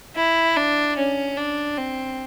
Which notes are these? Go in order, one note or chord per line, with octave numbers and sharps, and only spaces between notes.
E4
D4
C#4
D4
C4